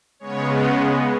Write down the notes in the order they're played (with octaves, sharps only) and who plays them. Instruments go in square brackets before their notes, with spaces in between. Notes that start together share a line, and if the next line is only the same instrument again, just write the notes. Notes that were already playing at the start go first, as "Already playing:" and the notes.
[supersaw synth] C#3 G#3 B3 C#5